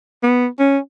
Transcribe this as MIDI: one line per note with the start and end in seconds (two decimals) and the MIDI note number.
0.23 0.47 59
0.59 0.78 61